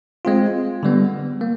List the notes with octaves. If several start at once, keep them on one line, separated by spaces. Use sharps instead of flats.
G#3 C4 F4
D3 G3 B3
A#3